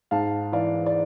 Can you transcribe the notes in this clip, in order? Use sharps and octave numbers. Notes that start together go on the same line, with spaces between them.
G#2 F5 A5
E3 D5 F5
D5